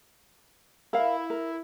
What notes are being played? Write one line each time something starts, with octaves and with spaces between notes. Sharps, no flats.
E4 A#4 F5
A#4